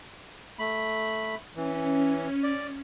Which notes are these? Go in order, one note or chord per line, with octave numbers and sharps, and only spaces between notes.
A3 B5
E3 C#4
D5